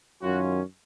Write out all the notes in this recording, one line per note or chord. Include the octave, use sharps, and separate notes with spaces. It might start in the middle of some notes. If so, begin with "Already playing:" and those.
F#2 D#3 F#3 C#4 F4 F#4